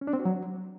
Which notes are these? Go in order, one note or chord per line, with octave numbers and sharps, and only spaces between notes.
C#4
D4
C4
F#4
F#3